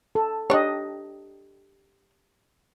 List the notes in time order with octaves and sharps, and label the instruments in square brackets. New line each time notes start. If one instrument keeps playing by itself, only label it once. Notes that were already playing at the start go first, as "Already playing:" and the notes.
[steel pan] A4
[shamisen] D4 C#5 [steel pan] G4 D#5